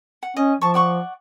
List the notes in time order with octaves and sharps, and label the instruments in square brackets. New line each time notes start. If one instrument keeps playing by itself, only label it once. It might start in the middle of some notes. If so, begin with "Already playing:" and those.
[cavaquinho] F#5
[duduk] C#4 [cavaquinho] D#5
[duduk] F3 [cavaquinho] A5 C#6
[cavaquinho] D5 F#5 C#6